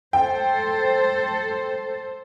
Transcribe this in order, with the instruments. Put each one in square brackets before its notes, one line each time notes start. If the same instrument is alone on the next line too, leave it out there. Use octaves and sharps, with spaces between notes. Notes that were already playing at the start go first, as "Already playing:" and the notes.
[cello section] A4 C5 [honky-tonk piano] G5